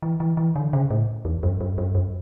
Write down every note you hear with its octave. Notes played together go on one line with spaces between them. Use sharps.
E3
E3
E3
D3
C#3
A2
E2
F#2
F#2
F#2
F#2